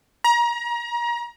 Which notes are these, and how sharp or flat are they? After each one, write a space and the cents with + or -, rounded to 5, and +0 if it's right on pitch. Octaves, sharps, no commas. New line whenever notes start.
A#5 +30